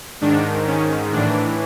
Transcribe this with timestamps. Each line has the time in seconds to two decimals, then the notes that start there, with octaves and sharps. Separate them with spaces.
0.21 G#2 D#3 D4
0.67 C#4
1.12 A2 E3 D4